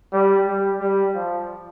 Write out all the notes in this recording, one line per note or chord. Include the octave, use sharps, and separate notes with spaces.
G3
G3
G3
F3